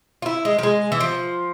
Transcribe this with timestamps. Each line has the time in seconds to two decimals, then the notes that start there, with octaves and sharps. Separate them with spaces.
0.22 F4
0.26 E4
0.45 G#3
0.59 F3
0.63 G#3
0.92 E3
1.00 F3